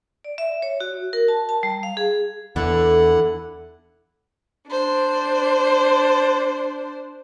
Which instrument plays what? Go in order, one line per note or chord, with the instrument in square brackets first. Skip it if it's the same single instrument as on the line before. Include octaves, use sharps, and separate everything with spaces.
[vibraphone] D5
E5
C#5
F#4
A#4
A5
A5
G3
F5
G#4
[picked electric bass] E2 [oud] D3 [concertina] E4 F#5
[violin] D4 C5